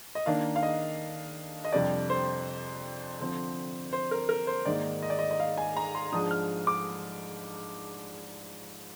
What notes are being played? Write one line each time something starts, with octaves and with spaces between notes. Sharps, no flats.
D#5
D#3 A#3 D4 F5
F5
D#5
D#5
F2 C3 G3 D4 D5
C5
D3 F3 C4
C5
A#4
A#4
C5
G#2 D#3 A#3 D#4 D5
D#5
D5
D#5
D#5
F5
G#5
A#5
C6
G#2 F3 G#3 D4 D#6
F6
D6